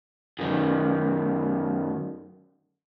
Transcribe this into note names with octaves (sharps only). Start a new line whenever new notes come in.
F#2 D#3